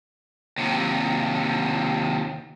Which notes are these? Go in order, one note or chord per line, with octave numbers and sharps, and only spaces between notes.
D#2 C3